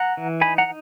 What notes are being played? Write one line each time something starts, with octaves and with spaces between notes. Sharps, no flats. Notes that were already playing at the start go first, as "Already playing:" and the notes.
Already playing: F#5 A#5
E3
D#4 G#5 B5
F#5 A#5